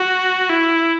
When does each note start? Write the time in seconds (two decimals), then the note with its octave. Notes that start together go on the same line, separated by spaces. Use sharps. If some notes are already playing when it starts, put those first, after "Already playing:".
Already playing: F#4
0.50 E4